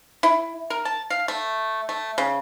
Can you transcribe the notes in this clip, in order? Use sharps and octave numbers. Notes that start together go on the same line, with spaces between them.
E4
A#4
A5
F5
A3
A3
C#3